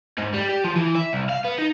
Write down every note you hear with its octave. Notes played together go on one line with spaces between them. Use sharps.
G#2
G3
G4
F3
E3
E5
C2
F5
B3
D#4